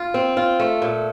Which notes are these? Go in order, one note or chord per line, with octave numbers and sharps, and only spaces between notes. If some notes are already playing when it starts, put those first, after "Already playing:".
Already playing: F4
C4
F4
A3
A#2